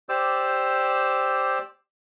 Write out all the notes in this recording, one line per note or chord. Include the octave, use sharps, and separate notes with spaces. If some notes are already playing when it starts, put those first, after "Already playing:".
G4 C5 D5 D6 E6